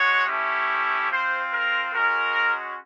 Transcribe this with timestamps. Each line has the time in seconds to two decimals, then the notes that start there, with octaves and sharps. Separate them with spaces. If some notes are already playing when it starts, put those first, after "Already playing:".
Already playing: G#3 F#4 C#5
0.27 A3 C#4 E4 G4
1.10 C4 F4 C5
1.52 A#4
1.94 G#3 C#4 F#4 A#4